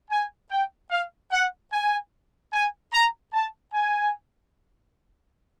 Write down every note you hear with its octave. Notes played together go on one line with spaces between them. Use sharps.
G#5
G5
F5
F#5
G#5
G#5
A#5
A5
G#5